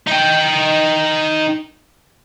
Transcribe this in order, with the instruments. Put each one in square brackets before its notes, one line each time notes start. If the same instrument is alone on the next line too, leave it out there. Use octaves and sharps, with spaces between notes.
[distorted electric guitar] D#4 G5